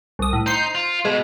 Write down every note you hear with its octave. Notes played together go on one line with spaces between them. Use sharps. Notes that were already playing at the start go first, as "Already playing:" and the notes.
C2 D#6
A2
D#4 C5 C7
F4
B2 G#3